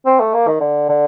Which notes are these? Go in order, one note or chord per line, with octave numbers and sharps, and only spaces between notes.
C4
A3
A#3
D#3
D3
D3